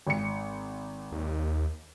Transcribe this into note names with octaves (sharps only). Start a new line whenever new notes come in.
G#1 C#7
D#2